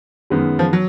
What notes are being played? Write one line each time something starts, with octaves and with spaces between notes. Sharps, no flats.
F#2 D#3 G#3 B3
F3
F#3